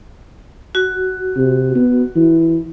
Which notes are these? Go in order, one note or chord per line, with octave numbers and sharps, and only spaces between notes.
F#4
C3
B3
E3